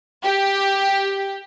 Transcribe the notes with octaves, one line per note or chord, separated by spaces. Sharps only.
G4